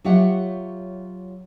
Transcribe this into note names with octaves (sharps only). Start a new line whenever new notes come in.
F#3 F4 G4 C#5 E5 F#5